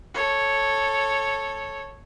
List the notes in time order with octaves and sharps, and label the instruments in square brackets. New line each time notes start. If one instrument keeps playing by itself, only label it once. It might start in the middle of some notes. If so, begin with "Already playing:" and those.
[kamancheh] A4 C#5